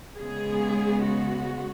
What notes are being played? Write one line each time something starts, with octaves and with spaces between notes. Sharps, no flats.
C#3 G#3 B3 G#4
F#4